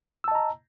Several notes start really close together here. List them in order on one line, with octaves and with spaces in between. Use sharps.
E6 A5 D#5 A#5